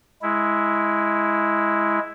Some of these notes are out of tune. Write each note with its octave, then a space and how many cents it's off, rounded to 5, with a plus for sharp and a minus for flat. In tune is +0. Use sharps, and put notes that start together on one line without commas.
G#3 +10 E4 +0